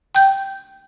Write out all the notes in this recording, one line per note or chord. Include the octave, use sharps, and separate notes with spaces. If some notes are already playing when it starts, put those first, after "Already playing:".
G5 G6